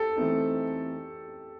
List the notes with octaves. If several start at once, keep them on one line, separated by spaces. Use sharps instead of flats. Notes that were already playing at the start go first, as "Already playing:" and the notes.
Already playing: G4 A4
E3 A3 C4 D#4